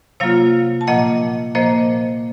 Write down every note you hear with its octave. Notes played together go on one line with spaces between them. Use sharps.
C3 F#3 A#3 F4 C#5 F5
A5
A#2 F3 A#3 D#5 F#5
A#2 F3 A#3 C5 D#5